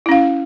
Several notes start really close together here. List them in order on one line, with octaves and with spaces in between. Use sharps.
E4 C#4 F5